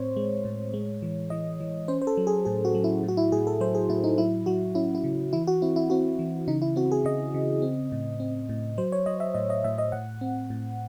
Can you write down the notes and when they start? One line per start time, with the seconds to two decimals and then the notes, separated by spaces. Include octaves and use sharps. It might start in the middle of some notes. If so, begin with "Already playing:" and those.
Already playing: A2 C4 C5 C#5
0.16 G#3
0.45 A2
0.74 G#3
1.02 E3
1.30 E3 D#5
1.60 E3
1.88 C#4 C5
2.02 C5
2.07 A4
2.17 F#3
2.27 G#4
2.45 A2 G#4
2.65 F#4
2.75 F#3
2.84 E4
3.03 A2
3.08 F#4
3.17 E4
3.32 A2 G#4
3.47 A4
3.61 F#3 C5
3.75 G#4
3.89 A2 E4
4.04 D#4
4.18 F#3 E4
4.46 F#3 F#4
4.75 C#4 E4
4.95 E4
5.04 C#3
5.33 E3 E4
5.47 F#4
5.62 C4 E4
5.76 E4
5.90 C4 F#4
6.19 E3
6.48 C#3 D#4
6.62 E4
6.76 C4 F#4
6.92 G#4
7.05 C#3 D#5
7.34 C#3
7.62 C4
7.92 A2
8.20 C4
8.49 A2
8.78 F#3 C5
8.92 C#5
9.06 F#3 D#5
9.20 E5
9.34 A2 D#5
9.50 D#5
9.64 A2 E5
9.78 D#5
9.92 A2 F#5
10.21 C4
10.50 A2